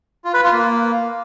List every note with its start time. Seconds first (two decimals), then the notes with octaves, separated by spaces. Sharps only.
0.24 F4
0.34 B4
0.43 F4
0.52 A#3